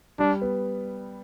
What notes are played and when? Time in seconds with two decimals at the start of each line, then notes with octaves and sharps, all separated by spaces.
0.19 G3 D4
0.42 B3